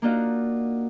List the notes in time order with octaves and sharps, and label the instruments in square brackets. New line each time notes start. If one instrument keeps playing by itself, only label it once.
[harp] A#3 D4 D#4 F4 F#4